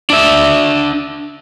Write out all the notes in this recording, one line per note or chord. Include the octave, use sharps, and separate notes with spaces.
D4 E5